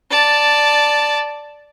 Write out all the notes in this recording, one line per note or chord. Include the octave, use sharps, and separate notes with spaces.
D5 A5